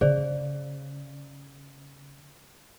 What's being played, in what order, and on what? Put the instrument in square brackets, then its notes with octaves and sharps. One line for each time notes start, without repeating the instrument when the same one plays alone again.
[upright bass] C#3 [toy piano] G#4 C5 D5